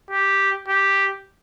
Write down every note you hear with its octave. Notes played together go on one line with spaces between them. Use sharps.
G4
G4